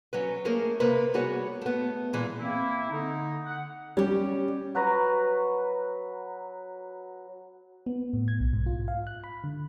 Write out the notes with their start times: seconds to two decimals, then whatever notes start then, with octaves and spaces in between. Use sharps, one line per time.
0.13 F#3 C#4 B4
0.45 A3 A#3 C#4 G#4 A#4
0.80 C3 A#3 A#4 B4
1.14 G3 B3 F#4 G#4 C#5
1.61 A3 B3
2.13 A#2 E3 G#3
2.39 A#3 C4 E4
2.90 D3 D#4
3.46 F#5
3.97 G3 C#4 G4
4.75 F#3 B4 A#5 C#6
7.86 B3
8.13 A2
8.28 G#6
8.40 B1
8.53 G#2
8.66 F4
8.88 F5
9.07 F#6
9.24 B5
9.44 D3